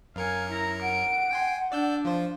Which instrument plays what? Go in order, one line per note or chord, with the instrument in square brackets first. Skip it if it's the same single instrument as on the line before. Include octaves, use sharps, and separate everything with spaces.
[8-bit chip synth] F#2 A#4 C#7 [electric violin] F5 G#5
[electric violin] E4 A#5
[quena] F#5 [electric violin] D7
[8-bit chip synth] G5 G#5 C6
[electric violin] D4 [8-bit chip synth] D5 E6 G6
[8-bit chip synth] F3 C5 [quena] F5